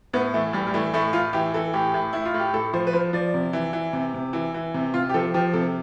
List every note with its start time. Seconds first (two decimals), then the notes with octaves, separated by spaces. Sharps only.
0.13 A2 B3
0.34 E3 A3
0.53 A2 G3
0.67 G3
0.74 E3 A3
0.94 A2 A3
1.13 A2 F4
1.33 E3 G4
1.54 E3 A4
1.74 A2 G4
1.94 A2
2.13 A2 E4
2.26 F4
2.34 A2
2.39 G4
2.53 A2 A4
2.73 F3 C5
2.87 B4
2.93 F3 C5
3.13 F3 D5
3.34 C3
3.53 E3
3.73 E3
3.93 C3
4.14 C3
4.33 E3
4.54 E3
4.74 C3
4.94 C3 F4
5.09 G4
5.14 F3 A4
5.34 F3 G4
5.54 C3 A4